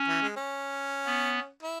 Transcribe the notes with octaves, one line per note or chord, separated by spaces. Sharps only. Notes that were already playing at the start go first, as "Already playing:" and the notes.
Already playing: C#4
E3
G#3
C#4
B3
E4